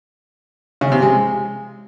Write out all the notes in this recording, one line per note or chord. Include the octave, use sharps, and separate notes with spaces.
C#3
C3
G#3